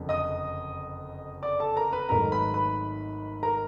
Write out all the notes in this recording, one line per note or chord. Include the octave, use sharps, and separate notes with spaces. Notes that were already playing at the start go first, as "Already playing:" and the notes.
Already playing: F#1 F2 D3
D#5 D#6
D5 D6
A4 A5
A#4 A#5
B4 B5
G#1 G#2 D#3 F#3 A3 A#4 A#5
B4 B5
B4 B5
A#4 A#5